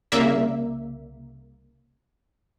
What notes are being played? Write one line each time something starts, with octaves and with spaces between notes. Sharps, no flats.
C2 C#3 A#3 D5 E5